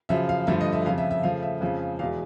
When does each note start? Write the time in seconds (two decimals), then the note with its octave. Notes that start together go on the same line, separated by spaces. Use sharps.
0.09 F#2 C#3 F3 E5
0.29 F5
0.47 G2 D3 F3 A3 E5
0.61 D#5
0.73 E5
0.85 F2 C#3 F3 F5
0.98 E5
1.11 E5
1.23 C#3 F3 A3 F5
1.42 E5
1.61 F2 C#3 F3 G#3
1.99 E2 B2 G#3 F5